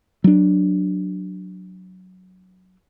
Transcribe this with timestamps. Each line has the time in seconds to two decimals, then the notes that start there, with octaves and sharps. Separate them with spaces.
0.24 F#3 D4